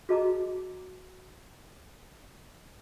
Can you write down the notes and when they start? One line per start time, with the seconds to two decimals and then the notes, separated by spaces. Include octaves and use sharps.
0.09 F#4 G#4 D#5 A5 A#5 D6